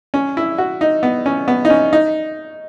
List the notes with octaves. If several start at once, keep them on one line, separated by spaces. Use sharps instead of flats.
C#4
E4
F#4
D#4
B3
C#4
B3
D#4
C#4
D#4